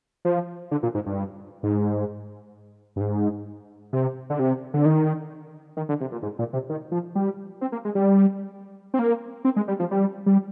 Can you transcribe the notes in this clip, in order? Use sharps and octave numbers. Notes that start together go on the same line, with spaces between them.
F3
D3
A#2
G#2
G2
G#2
G2
G#2
C3
D3
C3
D3
D#3
D#3
D3
C3
A#2
G#2
A#2
C3
D#3
F3
G3
C4
A#3
G#3
G3
C4
A#3
C4
G#3
G3
F3
G3
G3